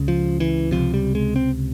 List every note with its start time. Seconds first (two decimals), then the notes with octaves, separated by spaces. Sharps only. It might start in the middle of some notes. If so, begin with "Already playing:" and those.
Already playing: C#2 C#3
0.08 F3
0.40 E3
0.71 C#2 C3 F3
0.94 G3
1.15 G#3
1.36 C4